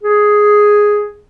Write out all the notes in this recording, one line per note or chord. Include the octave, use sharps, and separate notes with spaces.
G#4